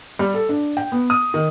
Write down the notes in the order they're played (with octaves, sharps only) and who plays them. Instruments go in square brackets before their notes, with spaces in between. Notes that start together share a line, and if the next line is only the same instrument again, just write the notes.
[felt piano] G3
A4
D4
G5
B3
D#6
D#3